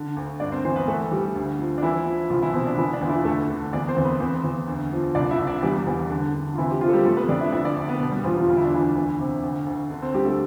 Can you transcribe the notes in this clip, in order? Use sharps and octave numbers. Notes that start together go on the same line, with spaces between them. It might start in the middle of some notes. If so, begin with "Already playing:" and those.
Already playing: D3
D2
G2 D4 D5
C4 C5
E3 C4 C5
B3 B4
E3 A3 A4
E3 G3 G4
D2
F3
D4
E3 F3 E4
F3
C2 F3 F4
E3 E4
B2 C4
D4
B2 E3 E4
D4
E2 F4
E3 E4
D2 A3 A4
D3
E2 D4 D5
C4 C5
E2
B3 B4
E2 C4 C5
E2
D2
F3
C2 D4 D5
E4 E5
C2
D4 D5
E2 G3 G4
E2
D3
D3
F4
C3 E3 E4
G4
C3 F3 F4
A4
G3 G4
F2 A3 A4
B3 B4
F2 D4 D5
E4 E5
D2 E4 E5
D4 D5
D2
B3 B4
B2
G3 G4
E2 F3 F4
F3 F4
D2 F4
E4
D4
D2 E3 E4
E3
C3
D2
D2
D3
C4
D2 G3 G4
A3 A4